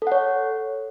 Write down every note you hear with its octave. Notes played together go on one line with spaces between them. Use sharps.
A4 C#5 F#5